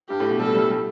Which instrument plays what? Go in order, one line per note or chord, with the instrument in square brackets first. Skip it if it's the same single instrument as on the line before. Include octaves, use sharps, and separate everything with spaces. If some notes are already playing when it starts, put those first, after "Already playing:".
[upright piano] G2 [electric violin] G4
[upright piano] A2
B2
[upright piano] G3 [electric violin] A4
[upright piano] A3
G3
G3